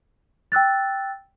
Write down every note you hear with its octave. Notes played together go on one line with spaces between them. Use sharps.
G5 E6 F#6 A6